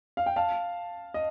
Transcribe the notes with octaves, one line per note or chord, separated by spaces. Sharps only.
F5
G5
F5 A5
D#5